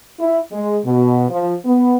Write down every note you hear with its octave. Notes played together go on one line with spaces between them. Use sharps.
E4
G#3
B2
F3
B3